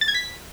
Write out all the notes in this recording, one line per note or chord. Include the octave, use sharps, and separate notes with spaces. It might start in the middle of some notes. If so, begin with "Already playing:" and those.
A6
G#6
B6